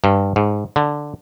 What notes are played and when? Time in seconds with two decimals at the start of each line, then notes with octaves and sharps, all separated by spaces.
0.04 G2
0.36 G#2
0.76 D3